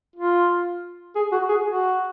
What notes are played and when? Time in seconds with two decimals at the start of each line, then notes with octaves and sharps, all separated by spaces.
0.16 F4
1.15 G#4
1.32 F#4
1.49 G#4
1.66 F#4